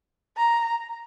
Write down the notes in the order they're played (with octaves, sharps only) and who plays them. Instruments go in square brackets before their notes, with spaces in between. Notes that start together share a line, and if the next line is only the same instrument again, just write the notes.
[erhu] A#5